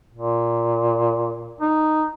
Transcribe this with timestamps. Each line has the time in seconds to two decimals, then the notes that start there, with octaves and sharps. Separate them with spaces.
0.14 A#2
1.61 D#4